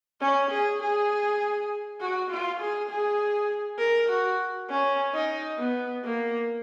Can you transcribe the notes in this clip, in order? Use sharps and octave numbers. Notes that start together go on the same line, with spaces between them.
C#4
G#4
G#4
F#4
F4
G#4
G#4
A#4
F#4
C#4
D#4
B3
A#3